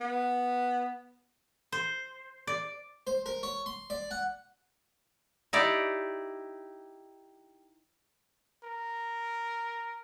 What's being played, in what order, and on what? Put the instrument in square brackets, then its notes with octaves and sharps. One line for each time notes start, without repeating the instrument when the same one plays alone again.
[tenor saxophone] B3
[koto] C5
D5
[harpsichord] C5
A#4
C#5
C6
D5
F#5
[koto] D#4 E4 G4 D5
[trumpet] A#4